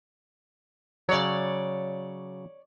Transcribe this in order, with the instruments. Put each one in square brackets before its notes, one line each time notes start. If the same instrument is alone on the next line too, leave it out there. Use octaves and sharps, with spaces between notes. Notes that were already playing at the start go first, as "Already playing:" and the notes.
[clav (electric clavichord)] C#3 F#3 [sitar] C#5 D5